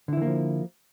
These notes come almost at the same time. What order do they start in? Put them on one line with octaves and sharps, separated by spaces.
D3 E4 E3 A#3 F3